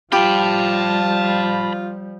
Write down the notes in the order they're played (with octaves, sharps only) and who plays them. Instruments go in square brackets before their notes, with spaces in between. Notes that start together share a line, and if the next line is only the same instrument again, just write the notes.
[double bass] F3 G3 [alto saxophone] F4 [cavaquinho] G4 [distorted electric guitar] A5 B5